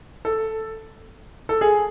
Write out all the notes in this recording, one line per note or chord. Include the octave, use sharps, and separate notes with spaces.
A4
A4
G#4